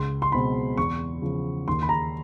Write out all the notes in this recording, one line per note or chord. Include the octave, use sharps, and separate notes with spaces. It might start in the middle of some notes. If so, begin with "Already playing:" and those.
Already playing: C#2 C6
C6
B2 G#3 C4 B5
E2 C#6
C#3 F3
D#2 C6
B5
A#5